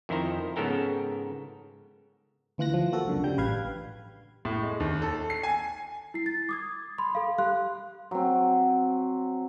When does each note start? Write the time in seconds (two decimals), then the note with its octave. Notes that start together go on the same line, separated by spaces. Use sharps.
0.09 F2 D#3 E4 C5 A#5
0.56 G#2 C#3 B3 A4 A#4 G5
2.58 D2 E3 F4 F#6 A#6
2.74 F3
2.92 A#3 F#4 A4
3.05 C#2 F#2 D3
3.23 C#3 G3 G5 G6
3.38 A1 B4 F5 G#6
4.45 A2
4.62 G#3
4.80 D#2
5.02 A4
5.30 C7
5.43 G#5
6.14 E4 C7
6.26 A6
6.49 D6 D#6 G#6
6.98 B5 C6
7.15 A4 F5
7.38 G4 F5 C6 F#6
8.11 F#3 C4